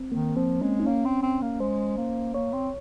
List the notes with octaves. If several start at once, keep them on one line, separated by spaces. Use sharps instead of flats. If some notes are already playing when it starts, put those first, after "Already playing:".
Already playing: C4
D#3 A#3
F3 C4
G#3 C#4
D#4
A#3 C#4
C4
C4
A#3
G#3 C5
A#3
A#3 C#5
C4